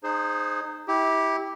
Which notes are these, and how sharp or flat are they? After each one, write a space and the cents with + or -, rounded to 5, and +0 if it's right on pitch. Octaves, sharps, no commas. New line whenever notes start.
D#4 -25 G#4 +0 C5 +0
E4 -30 G4 +0